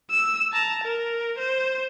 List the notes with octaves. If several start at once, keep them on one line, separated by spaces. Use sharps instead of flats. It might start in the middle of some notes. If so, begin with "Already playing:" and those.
E6
A5 A#5
A#4
C5